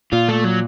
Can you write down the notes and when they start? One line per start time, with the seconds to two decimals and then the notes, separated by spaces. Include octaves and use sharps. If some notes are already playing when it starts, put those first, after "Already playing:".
0.12 A#2 F4
0.28 A3
0.44 F#3